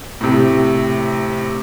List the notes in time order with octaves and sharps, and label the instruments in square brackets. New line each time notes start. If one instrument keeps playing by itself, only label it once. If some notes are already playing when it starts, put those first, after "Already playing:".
[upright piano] A2 C3